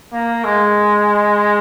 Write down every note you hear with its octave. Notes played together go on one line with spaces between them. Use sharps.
A#3
G#3